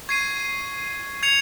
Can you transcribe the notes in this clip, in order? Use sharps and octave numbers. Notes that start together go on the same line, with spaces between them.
C#6 G#6 C7 D#7
G#6 C#7 F7